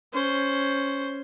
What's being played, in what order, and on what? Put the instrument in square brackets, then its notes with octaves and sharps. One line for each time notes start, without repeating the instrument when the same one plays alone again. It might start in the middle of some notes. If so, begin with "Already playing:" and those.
[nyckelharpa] C#4 C5